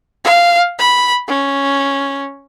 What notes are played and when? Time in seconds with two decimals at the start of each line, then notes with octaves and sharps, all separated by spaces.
0.25 F5
0.79 B5
1.28 C#4